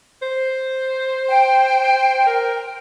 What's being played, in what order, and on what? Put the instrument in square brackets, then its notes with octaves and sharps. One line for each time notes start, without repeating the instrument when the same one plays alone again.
[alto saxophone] C5
[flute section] G5
[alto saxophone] A#4